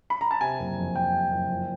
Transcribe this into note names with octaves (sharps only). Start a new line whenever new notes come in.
B5
A#5
A5
C3 G#5
F#1
F2
F#1 G5
C3
F#1
F3